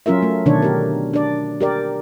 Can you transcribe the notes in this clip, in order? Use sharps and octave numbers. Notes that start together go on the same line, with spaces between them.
F#3 C#4 F4 A#4 E5
A3
B2 D3 D#3 D4 C#5
G4 A#4
D4 D5
G4 A#4 D5